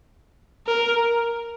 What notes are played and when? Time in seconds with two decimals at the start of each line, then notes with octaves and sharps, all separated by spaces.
0.67 A#4